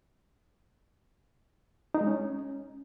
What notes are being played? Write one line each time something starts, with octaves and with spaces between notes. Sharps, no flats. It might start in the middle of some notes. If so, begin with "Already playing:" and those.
D#4
G#3
C#4